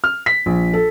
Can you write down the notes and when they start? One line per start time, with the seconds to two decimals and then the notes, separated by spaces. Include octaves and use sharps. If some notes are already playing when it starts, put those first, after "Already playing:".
0.04 F6
0.26 B6
0.46 A#1
0.73 A4